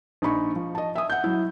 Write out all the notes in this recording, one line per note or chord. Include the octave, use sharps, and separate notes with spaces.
A#1 D#4 B5 C#6
F3
D#5 A5
E5 G#5 D#6
F#5 G6
F#3 E4